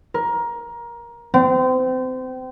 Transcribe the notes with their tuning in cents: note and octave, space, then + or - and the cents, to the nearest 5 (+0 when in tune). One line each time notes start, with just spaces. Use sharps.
A#4 +20
C4 -30